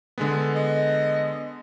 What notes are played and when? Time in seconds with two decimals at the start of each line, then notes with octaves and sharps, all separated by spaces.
0.18 D3 G#3 B3
0.55 D#5